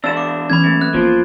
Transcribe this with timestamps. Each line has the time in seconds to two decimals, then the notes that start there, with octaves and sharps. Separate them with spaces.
0.04 E2 D4 E6 E7
0.17 D6
0.50 E3 B3 C#4 B5 G#6
0.64 F#2 A3 A#3
0.81 B3 F#6
0.94 G1 F3 A#3 D7